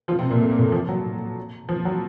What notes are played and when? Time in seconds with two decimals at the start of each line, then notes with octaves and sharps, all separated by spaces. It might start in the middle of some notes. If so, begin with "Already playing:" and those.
0.08 F3 F4
0.19 C3 C4
0.30 A#2 A#3
0.41 A3
0.50 A#3
0.59 A2 A3
0.72 F3
0.89 F#3
1.69 F3
1.85 F#3